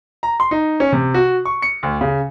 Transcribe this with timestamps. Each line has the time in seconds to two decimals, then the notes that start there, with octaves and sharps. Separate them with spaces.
0.23 A#5
0.40 C6
0.51 D#4
0.80 C#4
0.92 C3
1.14 F#4
1.45 C#6
1.62 C#7
1.83 D2
2.01 C#3